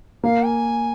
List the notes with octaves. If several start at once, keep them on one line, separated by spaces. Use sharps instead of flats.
A#3 F5
G#5